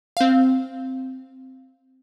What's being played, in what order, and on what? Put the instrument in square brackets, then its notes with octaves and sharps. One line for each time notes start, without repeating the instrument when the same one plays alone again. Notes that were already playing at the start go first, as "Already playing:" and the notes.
[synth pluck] C4 F5